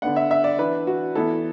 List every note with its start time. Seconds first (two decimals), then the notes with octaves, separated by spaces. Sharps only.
0.02 D3 B3 D4 F#5
0.16 E5
0.31 E5
0.44 D5
0.59 E3 D4 B4
0.87 F#4
1.15 E3 B3 E4 A4